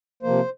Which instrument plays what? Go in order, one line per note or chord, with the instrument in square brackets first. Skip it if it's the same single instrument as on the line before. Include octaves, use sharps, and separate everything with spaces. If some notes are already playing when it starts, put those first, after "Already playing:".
[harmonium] C3 F3 A#3 C5